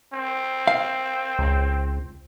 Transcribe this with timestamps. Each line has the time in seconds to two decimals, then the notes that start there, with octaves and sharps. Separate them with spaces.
0.13 C4
0.67 F5
1.39 C#2